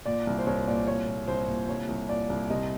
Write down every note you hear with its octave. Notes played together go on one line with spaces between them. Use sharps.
A#2 D5
C2
C5
C2 C#5
A#2 D5
C2 C#5
A#2
C2 C5
A#2
C2 C#5
C2
A#2 D5
C2
C3 D#5